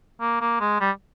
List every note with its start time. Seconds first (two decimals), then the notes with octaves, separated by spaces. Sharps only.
0.21 A#3
0.41 A#3
0.60 G#3
0.81 G3